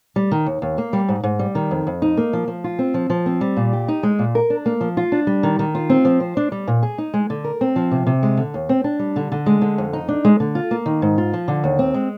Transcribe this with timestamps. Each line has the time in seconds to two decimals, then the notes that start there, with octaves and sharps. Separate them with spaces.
0.16 G3
0.31 D#3
0.46 D#2
0.62 D#2
0.78 A#3
0.93 G3
1.08 G#2
1.23 G#2
1.39 G3
1.55 D#3
1.71 F2
1.87 F2
2.02 D#4
2.17 A#3
2.33 F3
2.48 F3
2.64 F4
2.79 C4
2.94 F3
3.10 F3
3.26 C4
3.41 G3
3.57 A#2
3.73 G4
3.88 D#4
4.03 G#3
4.19 A#2
4.35 A#4
4.50 D4
4.66 A#3
4.81 F3
4.97 F4
5.12 D4
5.27 G3
5.43 D#3
5.59 D#3
5.75 F4
5.89 C4
6.05 F3
6.20 C5
6.37 D4
6.52 G3
6.67 A#2
6.83 G#4
6.98 D#4
7.14 G#3
7.30 D3
7.44 A#4
7.61 C4
7.76 F3
7.91 C3
8.06 C3
8.23 G#3
8.37 D3
8.54 D#2
8.69 C4
8.84 D4
8.99 G3
9.16 D3
9.32 D3
9.46 G#3
9.62 D3
9.78 F2
9.93 D#4
10.08 D4
10.25 G#3
10.40 D3
10.55 F4
10.71 A#3
10.86 D#3
11.02 G#2
11.18 F4
11.33 F3
11.48 D3
11.64 D#2
11.79 C4
11.94 G#3